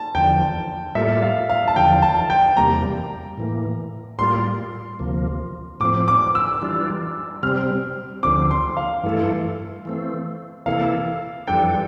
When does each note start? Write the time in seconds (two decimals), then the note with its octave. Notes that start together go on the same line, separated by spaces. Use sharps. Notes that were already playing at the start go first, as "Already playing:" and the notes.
Already playing: A5
0.15 E2 D3 F3 G5
0.95 A2 G3 A#3 F4 A4 E5
1.22 F5
1.50 F5
1.68 A5
1.76 E2 D3 F3 G5
2.02 A5
2.30 G5
2.57 E2 C3 G3 A#3 A#5
3.37 A2 E3 A#3
4.19 A2 G3 A#3 F4 C6
4.99 D2 C3 F3 A#3
5.80 A2 F3 C4 D6
6.08 D6
6.35 E6
6.62 E3 G3 D4 F4
7.43 C3 G3 C4 F6
8.23 D2 D3 F3 C4 D6
8.51 C6
8.77 F5
9.04 G2 E3 A3 E4 A4
9.85 E3 A3 C4
10.66 C3 E3 A#3 E4 A4 F5
11.47 F2 E3 G3 D4 A4 G5